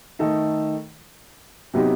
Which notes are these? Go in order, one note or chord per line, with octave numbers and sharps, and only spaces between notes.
D#3 A3 D#4 A4
C3 F#3 B3 D#4 G4